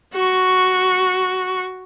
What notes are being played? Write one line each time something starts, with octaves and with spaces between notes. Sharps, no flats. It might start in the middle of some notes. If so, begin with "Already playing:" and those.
F#4 C#6